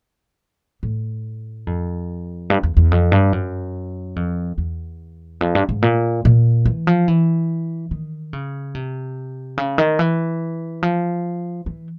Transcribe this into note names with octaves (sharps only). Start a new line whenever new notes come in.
A2
F2
G2
E2
E2
F2
G2
F#2
F2
E2
F2
G2
G#2
A#2
A#2
E3
F3
E3
D#3
C#3
C3
C#3
D#3
E3
F3
E3